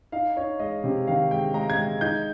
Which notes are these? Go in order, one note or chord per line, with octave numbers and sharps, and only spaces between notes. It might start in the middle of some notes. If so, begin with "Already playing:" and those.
D#4 F5
D#4 C#5
G#3 D#5
C3
D#3 F5
G#3 G5
G#3 A#5
G#6
G#3
D#4 G6